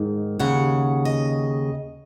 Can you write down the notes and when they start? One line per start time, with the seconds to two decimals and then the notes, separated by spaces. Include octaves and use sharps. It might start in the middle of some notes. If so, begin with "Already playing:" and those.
Already playing: G#2 D#3
0.39 D#2 C#3 F#5
1.05 D#5